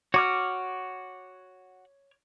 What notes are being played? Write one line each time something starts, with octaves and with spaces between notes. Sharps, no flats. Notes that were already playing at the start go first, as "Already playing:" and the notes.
F#4 C#5 D6 F6